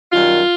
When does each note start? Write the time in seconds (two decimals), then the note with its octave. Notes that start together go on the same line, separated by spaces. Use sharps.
0.12 F#2 D#3 G3 F4